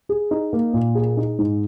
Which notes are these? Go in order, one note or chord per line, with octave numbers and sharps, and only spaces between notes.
G#4
D#4
A#3
A#2
G#4
D#4
G#2